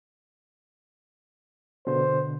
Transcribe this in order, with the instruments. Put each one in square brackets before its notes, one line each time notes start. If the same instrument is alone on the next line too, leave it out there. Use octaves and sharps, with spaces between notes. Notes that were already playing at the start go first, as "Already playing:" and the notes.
[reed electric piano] B2 D3 [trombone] C5